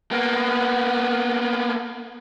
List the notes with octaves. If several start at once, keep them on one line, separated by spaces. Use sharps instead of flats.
A#3 B3